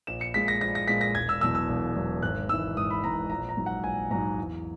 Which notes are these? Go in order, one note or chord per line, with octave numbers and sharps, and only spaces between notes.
A#1 E7
C#7
A#2 G#3 B6
A#6
A#1 A#6
A#6
A#2 G#3 B6
A#6
E1 G#6
E6
E2 B2 F#3 E6
E6
E1
E2 B2 F#3
G#1 F#6
G#2 E3 E6
G#1 D#6
B5
G#2 E3 A#5
A#1 A#5
A#5
G#2 F#3
F#5
A#1 G#5
G#2 F#3 A#5
E2